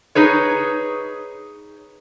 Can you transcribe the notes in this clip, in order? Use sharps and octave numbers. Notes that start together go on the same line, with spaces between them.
D#4 G#4 B4 C#5